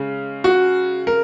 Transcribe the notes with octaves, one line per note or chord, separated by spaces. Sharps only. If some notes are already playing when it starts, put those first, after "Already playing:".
Already playing: C#3 G#3
F#4
A#4